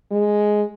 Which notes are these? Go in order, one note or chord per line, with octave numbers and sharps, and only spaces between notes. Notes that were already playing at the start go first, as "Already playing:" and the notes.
G#3